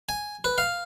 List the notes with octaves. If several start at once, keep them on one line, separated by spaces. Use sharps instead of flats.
G#5
B4
F5